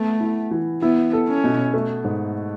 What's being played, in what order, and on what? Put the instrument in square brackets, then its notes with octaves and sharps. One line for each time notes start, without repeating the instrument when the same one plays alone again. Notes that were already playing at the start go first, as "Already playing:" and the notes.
Already playing: [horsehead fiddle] A3 [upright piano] B3
[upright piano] E4
E3
[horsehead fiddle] B3 [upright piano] E4
[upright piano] A4
[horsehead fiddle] C#4
[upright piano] B2
A3
G#2